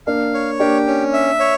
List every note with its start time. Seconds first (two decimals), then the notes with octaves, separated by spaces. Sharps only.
0.07 A#3 D4 F5
0.34 C#5
0.60 A#3 D4 G4
0.87 C#4
1.13 E5
1.40 C#5